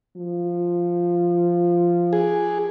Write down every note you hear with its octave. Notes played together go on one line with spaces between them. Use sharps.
F3
G#4